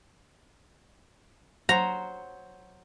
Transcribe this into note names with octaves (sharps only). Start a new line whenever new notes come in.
F#3 F#4 C5 A#5